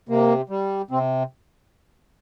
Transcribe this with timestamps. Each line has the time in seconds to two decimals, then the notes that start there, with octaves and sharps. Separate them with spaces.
0.09 C3 A#3
0.49 G3
0.91 C3 C4